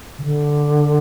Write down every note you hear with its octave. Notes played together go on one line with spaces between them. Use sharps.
C#3
D3